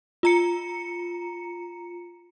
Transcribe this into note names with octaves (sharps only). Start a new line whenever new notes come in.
F4 A#5 C#7